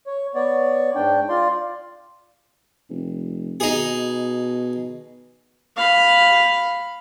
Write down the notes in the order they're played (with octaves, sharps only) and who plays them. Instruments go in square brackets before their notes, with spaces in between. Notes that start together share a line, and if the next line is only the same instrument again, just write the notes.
[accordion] C#5
B3 C#5 D5
G#2 D4 G5
F4 D5 C6
[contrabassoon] F1
[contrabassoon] B2 [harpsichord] D#4 G#4
[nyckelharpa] F5 B5